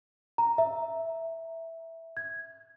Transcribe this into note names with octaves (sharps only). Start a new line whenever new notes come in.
A#5
E5
G#6